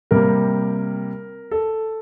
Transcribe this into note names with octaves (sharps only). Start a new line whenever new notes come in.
C3 G3 A#3 A#4
A4